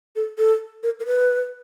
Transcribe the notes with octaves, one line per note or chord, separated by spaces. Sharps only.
A4
A4
A#4
A#4
B4